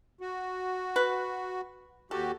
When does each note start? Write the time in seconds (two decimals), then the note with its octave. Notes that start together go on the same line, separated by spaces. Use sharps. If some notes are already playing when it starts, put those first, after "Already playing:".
0.21 F#4
0.96 B4
2.11 D#2 F#4 G4 A4